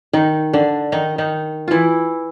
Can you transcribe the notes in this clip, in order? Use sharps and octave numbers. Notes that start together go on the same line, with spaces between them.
D#3 D#4
D3 D4
D#3 D#4
D#3 D#4
E3 E4 F4